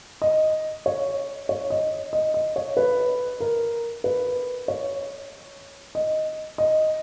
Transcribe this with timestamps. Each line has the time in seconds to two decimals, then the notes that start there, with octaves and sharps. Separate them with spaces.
0.22 D#5
0.86 C#5
1.49 C#5
1.70 D#5
2.13 D#5
2.34 D#5
2.56 C#5
2.77 B4
3.40 A#4
4.04 B4
4.68 C#5
5.95 D#5
6.58 D#5